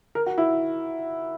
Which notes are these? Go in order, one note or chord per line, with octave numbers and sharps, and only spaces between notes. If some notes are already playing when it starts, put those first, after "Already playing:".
A#4
F#4
E4